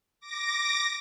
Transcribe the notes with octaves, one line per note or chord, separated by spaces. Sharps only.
D6 A#6